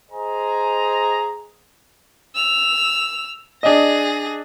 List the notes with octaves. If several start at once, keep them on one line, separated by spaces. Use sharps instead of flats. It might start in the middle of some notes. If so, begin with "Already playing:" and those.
G#4 C5 D#5 G#5 A#5
E6 F7
D4 G#4 D#5 A#6